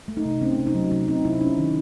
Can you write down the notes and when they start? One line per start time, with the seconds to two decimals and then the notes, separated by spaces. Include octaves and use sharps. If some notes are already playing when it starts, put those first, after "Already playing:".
0.08 A3
0.17 D#4
0.25 C3
0.42 C4 C#4
0.59 C3
0.67 D#4
0.74 F#3
0.91 C3 D#4
1.08 C4 D#4
1.25 C3 E4
1.41 C#4 D#4
1.58 D#3